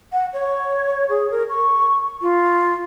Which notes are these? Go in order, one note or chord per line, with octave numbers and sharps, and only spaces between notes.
F#5
C#5
G#4
A#4
C#6
F4